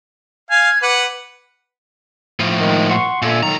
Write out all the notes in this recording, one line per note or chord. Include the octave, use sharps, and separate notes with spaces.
F5 G#5 G#6
B4 F#5 D6
A2 F3
D#3 G#3
F#5 C6 C#6
A#2 D3 E5 G#5
C#2 D#3 F#3 A4 A#5